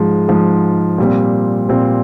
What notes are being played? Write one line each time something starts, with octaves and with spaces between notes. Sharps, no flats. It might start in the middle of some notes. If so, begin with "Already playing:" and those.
Already playing: G#2 F3 G#3
G#2 F3 G#3
A#2 G3 C4
A#2 G3 C4